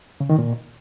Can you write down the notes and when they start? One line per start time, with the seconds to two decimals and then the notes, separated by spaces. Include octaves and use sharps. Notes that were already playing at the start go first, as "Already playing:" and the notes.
0.20 C#3
0.30 D#3
0.39 A#2